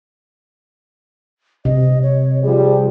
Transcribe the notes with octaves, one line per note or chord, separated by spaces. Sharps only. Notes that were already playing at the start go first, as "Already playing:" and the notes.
C3 D#5
C#5
F3 G3 G#4